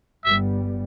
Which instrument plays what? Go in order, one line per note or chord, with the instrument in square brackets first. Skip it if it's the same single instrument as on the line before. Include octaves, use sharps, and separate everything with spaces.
[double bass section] G1 G2 G3 B3 [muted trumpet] E5